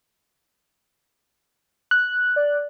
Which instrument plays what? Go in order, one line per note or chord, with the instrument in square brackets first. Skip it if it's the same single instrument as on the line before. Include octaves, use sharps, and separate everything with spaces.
[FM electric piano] F#6
[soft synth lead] D5